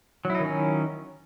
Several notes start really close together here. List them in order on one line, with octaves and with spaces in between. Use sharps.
F#3 E4 D#4 D#3 C#4